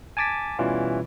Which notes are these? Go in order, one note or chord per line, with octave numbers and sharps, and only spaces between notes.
G#5 A5 D6 A6 B6
B2 E3 G3 C#4 F4 F#4